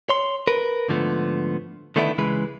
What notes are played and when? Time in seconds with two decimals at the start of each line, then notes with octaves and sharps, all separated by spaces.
0.09 C#5 C6
0.47 A#4 B4
0.88 G#2 D3 F3 A3 B3
1.96 D3 D#3 A3 B3 D4 E4
2.18 C#2 C#3 E3 G#3 B4